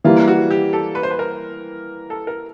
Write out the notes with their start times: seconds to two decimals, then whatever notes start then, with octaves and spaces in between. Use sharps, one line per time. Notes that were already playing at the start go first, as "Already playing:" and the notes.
0.04 E3 G3 A#3 F4
0.28 F#4
0.51 G4
0.73 A4
0.95 B4
1.03 C5
1.10 B4
1.19 A#4
2.10 A4
2.27 A#4